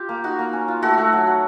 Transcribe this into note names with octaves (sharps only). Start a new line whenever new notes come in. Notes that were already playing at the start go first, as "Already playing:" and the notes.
Already playing: F4 G4
A#3
D#4 F#4
A#3
C#4
F4
A3 F#4
A3
F#3
F#3